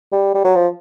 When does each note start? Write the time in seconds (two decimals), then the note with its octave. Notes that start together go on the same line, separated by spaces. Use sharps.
0.12 G3
0.34 G3
0.44 F#3
0.56 F3